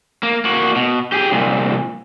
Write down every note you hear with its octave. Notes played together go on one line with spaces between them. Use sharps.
A#3
A#3 F#4
B2
G4 G#4
C2 A#2